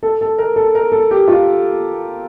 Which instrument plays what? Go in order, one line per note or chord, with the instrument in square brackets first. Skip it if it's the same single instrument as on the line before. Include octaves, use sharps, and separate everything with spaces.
[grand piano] A4
A4
A#4
A4
A#4
A4
G4
F4